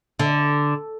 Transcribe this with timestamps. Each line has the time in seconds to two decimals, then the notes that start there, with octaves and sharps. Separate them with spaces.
0.19 D3